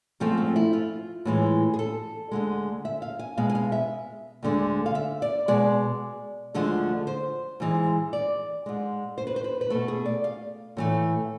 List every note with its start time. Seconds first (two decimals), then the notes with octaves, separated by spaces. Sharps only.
0.20 G#2 F3 A3 C4
0.38 C4
0.56 E4
0.73 F4
1.25 A2 E3 G#3
1.74 G#4
1.79 A4
2.32 D2 D3 G#3
2.85 E5
3.02 F5
3.19 G#5
3.37 B2 G#3 F5
3.50 G#5
3.55 F5
3.72 E5
4.43 D2 D3 G#3
4.86 F5
4.95 E5
5.22 D5
5.48 B2 G#3 D5
6.54 D2 D3 F3 G#3
7.07 C5
7.60 G#2 E3 G#3
8.13 D5
8.66 G#2 G#3
9.18 C5
9.27 B4
9.36 C5
9.44 B4
9.61 B4
9.70 B2 A3 A4
9.88 G#4
10.06 D5
10.24 F5
10.77 A2 E3 A3